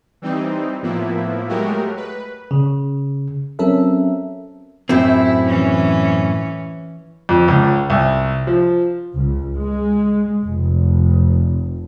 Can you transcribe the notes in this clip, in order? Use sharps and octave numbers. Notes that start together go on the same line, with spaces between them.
E3 G3 C4 D#4
A2 F3 A#3 B3 E4
F#3 G#3 A3 F#4 G4 A#4
B4
C#3
F#3 C4 C#4 A4 A#4 E5
F#2 A2 C4 E4
E3 C#4
F2
C#2
C2
F3
C#2
G#3
F1